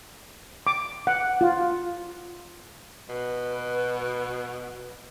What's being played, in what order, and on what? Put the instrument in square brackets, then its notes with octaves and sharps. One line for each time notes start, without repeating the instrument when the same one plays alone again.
[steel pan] D6
F#5
F4
[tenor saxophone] B2 [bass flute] B4